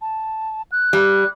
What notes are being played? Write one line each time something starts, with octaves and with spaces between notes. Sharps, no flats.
A5
F#6
G3